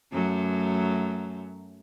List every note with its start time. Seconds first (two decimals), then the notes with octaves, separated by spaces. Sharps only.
0.12 F#2 F#3 A3